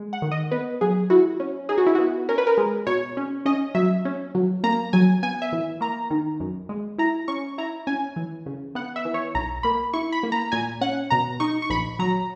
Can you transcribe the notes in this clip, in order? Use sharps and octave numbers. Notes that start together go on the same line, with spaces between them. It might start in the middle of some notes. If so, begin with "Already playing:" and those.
Already playing: G#3
F#5
D#3
D#5
B3 B4
F#3 G#4
E4 F#4
C#4
D#4 G#4
F#4
E4
B3 F#4
C#4 A#4
B4
A#4
G#3
B2 C#5
C#4
C#4 D#5
F#3 E5
C#4
F#3
A#3 A#5
F#3 G#5
B3 G#5
E5
E3
A#3 A#5
D#3
F#2
G#3
E4 A#5
C#4 C#6
E4 A#5
C#4 G#5
E3
C#3
B3 F#5
E5
E3
C#5
B1 A#5
A#3 B5
E4 C#6
B5
A#3
A#5
A#2 G#5
C#4 F#5
B2 A#5
D#4 C#6
C#6
A#1 B5
F#3 A#5